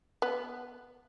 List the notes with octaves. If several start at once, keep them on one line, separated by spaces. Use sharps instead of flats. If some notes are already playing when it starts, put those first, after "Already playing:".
B3